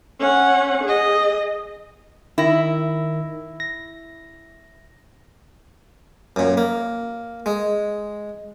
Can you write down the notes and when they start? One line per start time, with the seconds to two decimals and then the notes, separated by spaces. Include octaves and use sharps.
0.20 C#4 F#5
0.84 G#4 D#5
2.38 D#3 E4 A#6
3.60 A#6
6.36 F#2 A#2
6.57 A#3
7.46 G#3